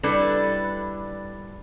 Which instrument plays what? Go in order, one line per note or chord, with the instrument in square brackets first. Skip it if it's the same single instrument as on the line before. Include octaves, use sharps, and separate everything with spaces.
[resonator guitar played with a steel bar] G3 D4 E4 A4 B4